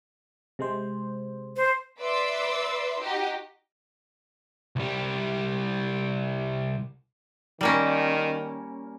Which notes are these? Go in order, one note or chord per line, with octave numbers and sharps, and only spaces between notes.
C3 G#3 C5
C5
B4 D5 E5 C6 D6 E6
D#4 F#4 G4 D#5
C2 G3
D#3 G3 A#3 C#4